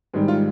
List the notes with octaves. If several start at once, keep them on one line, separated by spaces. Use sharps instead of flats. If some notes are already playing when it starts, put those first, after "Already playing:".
G#2 D#3 G3
F4